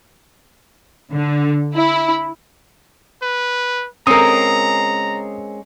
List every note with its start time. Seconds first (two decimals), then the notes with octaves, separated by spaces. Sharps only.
1.12 D3
1.75 E4
3.22 B4
4.07 G#3 C4 C#4 A#4 A#5 D#6